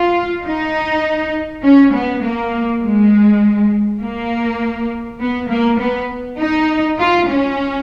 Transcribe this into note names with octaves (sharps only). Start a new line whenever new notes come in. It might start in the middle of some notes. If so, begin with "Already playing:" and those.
Already playing: F4
D#4
C#4
B3
A#3
G#3
A#3
B3
A#3
B3
D#4
F4
C#4